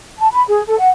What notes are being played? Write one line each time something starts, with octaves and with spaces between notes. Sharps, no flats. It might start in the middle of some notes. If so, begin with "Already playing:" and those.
A5
B5
G#4
A4
F#5